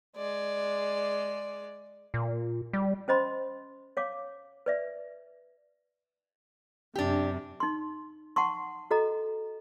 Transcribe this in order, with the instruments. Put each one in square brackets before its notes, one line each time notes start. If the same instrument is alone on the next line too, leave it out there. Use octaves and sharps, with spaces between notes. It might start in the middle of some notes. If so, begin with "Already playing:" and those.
[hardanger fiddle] G#3 D5
[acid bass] A#2
G3
[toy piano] C#4 C5 D#5 B5 C6
C#5 F5 D6
B4 D5 E5
[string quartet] F#2 C3 [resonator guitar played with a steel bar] D4 G4
[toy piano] D#4 C6
F#5 A5 C6 C#6
F#4 A4 D#5 A#5